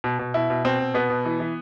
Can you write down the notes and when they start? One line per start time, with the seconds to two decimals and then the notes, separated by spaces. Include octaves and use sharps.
0.04 B2
0.19 B2
0.34 B2 E4
0.50 B2
0.65 B2 C4
0.80 B2
0.94 B2 B3
1.10 B2
1.25 E3
1.40 E3